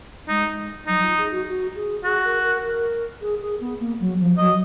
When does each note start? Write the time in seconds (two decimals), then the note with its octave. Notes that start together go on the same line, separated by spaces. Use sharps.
0.28 G#3 D#4
0.87 F#3 D#4
1.02 F4
1.17 G#4
1.31 F#4
1.46 F#4
1.75 G#4
2.04 F#4 G#4
2.24 A#4
2.43 A#4
2.63 A#4
3.21 G#4
3.41 G#4
3.60 B3
3.79 A#3
3.99 F#3
4.18 F3
4.38 F#3 D#5